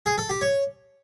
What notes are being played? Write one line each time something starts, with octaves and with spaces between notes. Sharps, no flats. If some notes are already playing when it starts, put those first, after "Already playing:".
G#4
A4
G4
C#5